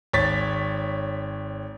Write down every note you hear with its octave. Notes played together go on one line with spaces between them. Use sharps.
G#1 C#5 A6 B6